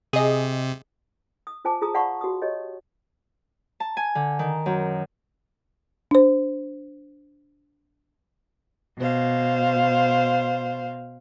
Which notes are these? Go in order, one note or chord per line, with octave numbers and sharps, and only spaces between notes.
C3 G#4 D#5
D#6
F4 C5 G#5 A5 D6
F4 G#4 A#5 D#6
D5 F5 F#5 A5 B5 C#6
F#4 D#6
G4 C#5 D#5
A5
G#5
D3
D#3
F#2
D4 C5
B2 C5 F5